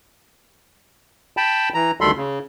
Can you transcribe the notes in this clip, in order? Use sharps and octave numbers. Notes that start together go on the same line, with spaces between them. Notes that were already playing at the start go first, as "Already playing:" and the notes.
G5 A5 B5
E3 A#5
D2 D#3 G3 A4 B5 C6
C#3